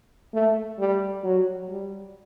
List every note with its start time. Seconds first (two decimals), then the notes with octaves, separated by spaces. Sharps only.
0.34 A3
0.79 G3
1.24 F#3
1.69 G3